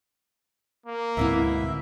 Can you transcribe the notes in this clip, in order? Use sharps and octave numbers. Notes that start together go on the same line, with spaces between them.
A#3
D2 G#2 B2 C4 E4 E5